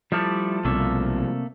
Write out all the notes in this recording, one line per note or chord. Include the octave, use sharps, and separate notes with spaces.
F3 G3 A3 E4 A4 D5
B1 C3 G3 A3 A#3 D4 A4 E5